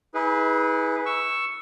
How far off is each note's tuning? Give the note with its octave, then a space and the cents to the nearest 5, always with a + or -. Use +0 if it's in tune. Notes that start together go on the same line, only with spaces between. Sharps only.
E4 -45 G#4 +0 B4 -5
C#6 +0 E6 +0